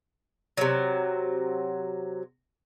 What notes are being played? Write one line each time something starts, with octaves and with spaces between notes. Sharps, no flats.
C3 F#3